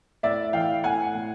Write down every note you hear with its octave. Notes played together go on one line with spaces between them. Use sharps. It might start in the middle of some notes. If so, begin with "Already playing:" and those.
A2 D5 E5
E3 F5 G5
A2 F#5 G#5
A2